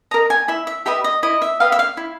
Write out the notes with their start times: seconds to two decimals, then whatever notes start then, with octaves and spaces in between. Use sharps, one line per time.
0.11 A#4 D#5 A#5
0.30 G#5
0.48 E4 E5
0.67 E5
0.86 G4 B4 D#5 E5
1.04 D#5
1.23 E4 D#5
1.42 E5
1.60 G4 B4 D#5 F5
1.72 E5
1.79 F5
1.97 E4